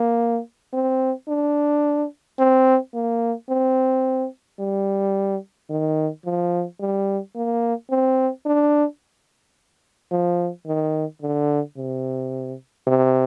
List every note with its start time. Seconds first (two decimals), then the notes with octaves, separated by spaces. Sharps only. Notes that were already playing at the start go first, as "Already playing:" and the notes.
Already playing: A#3
0.73 C4
1.28 D4
2.39 C4
2.94 A#3
3.49 C4
4.59 G3
5.70 D#3
6.25 F3
6.80 G3
7.35 A#3
7.90 C4
8.46 D4
10.11 F3
10.67 D#3
11.22 D3
11.77 C3
12.87 C3